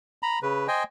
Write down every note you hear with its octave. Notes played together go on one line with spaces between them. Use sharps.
A#5 B5
C#3 B4
C5 D#5 G5 G#5